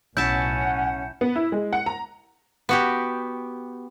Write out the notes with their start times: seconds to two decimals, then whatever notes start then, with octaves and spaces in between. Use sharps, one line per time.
0.17 B1 A2 C#4 E4 F#5 A5 G6 E7
1.21 B3
1.36 E4
1.52 G#3
1.73 F#5
1.86 A#5
2.69 B3 F#4 G4